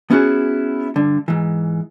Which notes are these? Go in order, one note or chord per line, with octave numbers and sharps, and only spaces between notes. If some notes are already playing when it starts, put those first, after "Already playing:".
B3 C#4 E4 F#4 G#4
G2 D3
G#2 E3